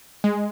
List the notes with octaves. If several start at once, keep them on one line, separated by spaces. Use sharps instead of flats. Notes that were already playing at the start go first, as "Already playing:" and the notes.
G#3